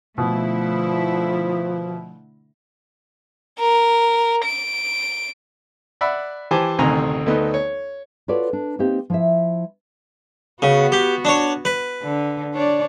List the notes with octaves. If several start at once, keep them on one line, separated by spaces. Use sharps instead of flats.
B2 D3 F3 A3 E4
A#4
D7
D5 E5 F#5 B5
E3 G4 C5 G#5 A5 D6
A1 D2 C3 D#3 G#5 A#5
D2 A3 B3 D#4
C#5
F4 F#4 A4 B4 C#5 D5
D4
A#3 C4 D#4 G4
F3 E4 E5
C#3 B3 F#4
G4
D4 C#5
B4
D3
D4 C#5 D5